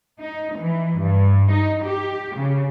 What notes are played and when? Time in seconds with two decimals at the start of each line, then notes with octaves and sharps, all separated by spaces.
0.20 D#4
0.57 E3
0.97 G2
1.51 D#4
1.84 G4
2.36 C#3